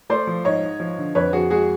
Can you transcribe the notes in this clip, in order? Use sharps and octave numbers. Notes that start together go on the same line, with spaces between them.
A3 C5 D5
F3
G#2 C#5 D#5
G#2
F3
D3
F2 B4 C#5
F2 F#4 G#4
G#3 F#4 G#4